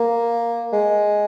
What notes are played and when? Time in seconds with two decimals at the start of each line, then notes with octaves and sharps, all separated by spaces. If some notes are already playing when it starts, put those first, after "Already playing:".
Already playing: A#3
0.72 G#3